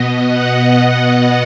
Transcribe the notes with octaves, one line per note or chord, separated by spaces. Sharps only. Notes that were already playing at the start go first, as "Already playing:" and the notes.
Already playing: B2 B3 D#5
F#5